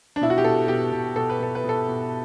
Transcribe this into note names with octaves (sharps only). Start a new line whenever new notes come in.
D4
B2 E4
F#4
G4
B2 A4
B2 G4
B2
B2 A4
B4
B2 A4
B4
B2 A4
B2